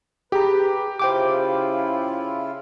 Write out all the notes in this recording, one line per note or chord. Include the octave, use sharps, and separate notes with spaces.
G4 G#4 B4 A#5
C#3 E4 F4 C5 G5 D6